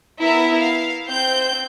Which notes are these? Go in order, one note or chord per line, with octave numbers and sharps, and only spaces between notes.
B3 E4 A#4 E5
F5
C4 G6